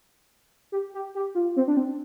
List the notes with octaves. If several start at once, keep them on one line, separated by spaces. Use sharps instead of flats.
G4
G4
G4
F4
C4
D4
C4